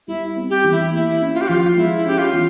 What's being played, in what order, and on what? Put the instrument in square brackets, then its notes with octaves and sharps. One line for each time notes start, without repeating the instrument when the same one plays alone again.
[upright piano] G3 [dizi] E4
[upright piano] C4
[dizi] G4
[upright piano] E3
[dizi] E4
[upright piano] A#3 [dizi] E4
[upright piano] C#4
[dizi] F4
G4
[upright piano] F3 [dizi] F4
[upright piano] G#3 [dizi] E4
[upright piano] C#4 [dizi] G4
[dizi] F4
[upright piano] E3